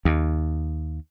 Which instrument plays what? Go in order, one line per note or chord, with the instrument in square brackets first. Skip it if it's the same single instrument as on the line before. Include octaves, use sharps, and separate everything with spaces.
[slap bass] D#2